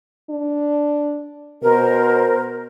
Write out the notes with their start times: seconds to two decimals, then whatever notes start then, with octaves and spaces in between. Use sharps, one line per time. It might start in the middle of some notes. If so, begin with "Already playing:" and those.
0.30 D4
1.63 B2 A#4 C5